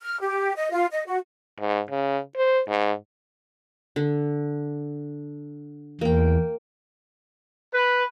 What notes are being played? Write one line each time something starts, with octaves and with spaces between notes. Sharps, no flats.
F6
G4
D#5
F4
D#5
F#4
G#2
C#3
C5
G#2
D3
E2 A#3 G5
B4